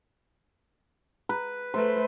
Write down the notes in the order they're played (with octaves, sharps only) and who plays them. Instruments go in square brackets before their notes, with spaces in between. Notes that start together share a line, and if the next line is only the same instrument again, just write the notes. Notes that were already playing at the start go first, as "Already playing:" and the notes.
[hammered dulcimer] B4
[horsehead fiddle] A3 B4 [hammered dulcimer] C5